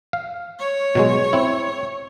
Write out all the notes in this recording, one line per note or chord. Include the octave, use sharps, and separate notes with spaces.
F5
C#5
B2 F#3 G#3
C4 E4